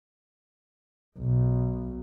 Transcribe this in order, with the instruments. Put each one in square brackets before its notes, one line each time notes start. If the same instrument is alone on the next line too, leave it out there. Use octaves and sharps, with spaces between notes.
[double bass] B1